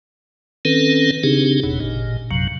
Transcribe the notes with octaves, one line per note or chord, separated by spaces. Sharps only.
D#3 C4 C#4 A4 B4
C#3 C4 D4 D#4 G4 G#4
F#1 E2 B2
G#1 A#2
A#1 F#2 C3 F#3